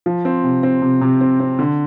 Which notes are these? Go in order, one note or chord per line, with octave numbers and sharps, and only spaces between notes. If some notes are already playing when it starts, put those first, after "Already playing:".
F3
C4
C3
C4
C3
C3
C4
C4
D3